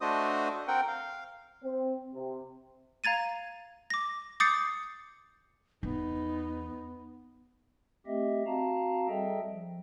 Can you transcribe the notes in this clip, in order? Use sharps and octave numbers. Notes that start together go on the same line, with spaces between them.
A3 D4 F#4 C5 D#5 D#6
C4 A#4 F#5 G5
F5
C4
C3
F5 A#5 G#6 A6 D#7
D6 A#6
D6 D#6 G6 A6 C7 C#7
E2 B3 D#4
A3 C4 G4 D#5 E5
C4 F#4 F5 A5 A#5
G3 G#4 A4 D#5 E5 G5
F3